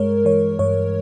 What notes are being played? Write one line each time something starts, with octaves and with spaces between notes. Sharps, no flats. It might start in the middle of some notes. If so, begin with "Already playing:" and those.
Already playing: G2 G#3 A#4 C#5
E3 C#5
G2 C#5